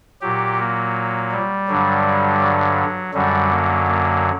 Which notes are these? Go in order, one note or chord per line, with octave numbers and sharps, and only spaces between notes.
A#2 F#3 G4
A#3
G3
G2 D3 F#3
F#3
F#2 D3 F#3 G3
A#3
A#3